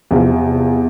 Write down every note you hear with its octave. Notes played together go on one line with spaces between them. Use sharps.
E2 C3 F3